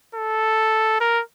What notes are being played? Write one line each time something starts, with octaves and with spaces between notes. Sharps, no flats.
A4
A#4